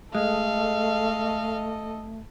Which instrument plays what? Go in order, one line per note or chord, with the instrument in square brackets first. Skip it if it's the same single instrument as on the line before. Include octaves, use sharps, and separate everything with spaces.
[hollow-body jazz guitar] G#3 [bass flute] A3 [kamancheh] A4 D#5 [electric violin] F5